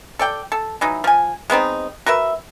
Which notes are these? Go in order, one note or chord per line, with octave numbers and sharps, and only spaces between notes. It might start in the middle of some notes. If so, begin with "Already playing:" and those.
A4 D5 G5
A4
E3 F#3 D#4
F3 G#5
G#3 B3 C4 D#4
F#4 A#4 B4 E5